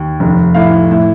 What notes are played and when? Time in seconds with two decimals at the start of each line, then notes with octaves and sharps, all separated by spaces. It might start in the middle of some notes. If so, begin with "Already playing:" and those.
Already playing: D#2
0.20 F1
0.54 A2 F5
0.91 A2